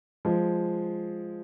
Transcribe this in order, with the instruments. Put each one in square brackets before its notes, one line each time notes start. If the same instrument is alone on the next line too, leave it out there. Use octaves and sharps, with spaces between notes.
[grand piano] F3 G#3